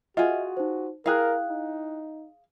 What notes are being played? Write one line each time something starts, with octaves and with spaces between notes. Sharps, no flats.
F4 F#4 G#4 D#5 E5 F#5
D#4 C5
E4 G#4 A#4 F5 G5 F#6
D#4